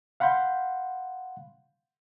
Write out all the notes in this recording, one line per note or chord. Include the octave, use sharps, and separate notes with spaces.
F5 F#5 B5 C6 G6